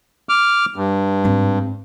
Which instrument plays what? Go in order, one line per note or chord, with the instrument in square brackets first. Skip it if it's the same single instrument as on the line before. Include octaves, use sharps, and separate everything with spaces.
[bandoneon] D6 F6
G2
[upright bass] G#2 C4